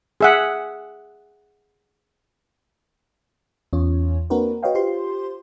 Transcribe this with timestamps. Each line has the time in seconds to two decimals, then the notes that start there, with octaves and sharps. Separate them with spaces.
0.21 G#4 E5 F#5
3.73 E2 C#4 F4 C#5
4.30 A#3 C4 D4 F#4 A#4 B4
4.63 F#4 B4 C#5 D#5 F5 G5
4.75 F4 G4 C5 C6